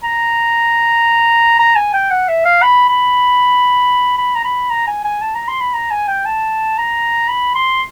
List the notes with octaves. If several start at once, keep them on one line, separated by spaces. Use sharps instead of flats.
A#5
A#5
G#5
G5
F#5
E5
F5
B5
B5
B5
A#5
B5
A#5
G#5
G#5
A5
A#5
C6
B5
A#5
G#5
G5
A5
A#5
B5
C6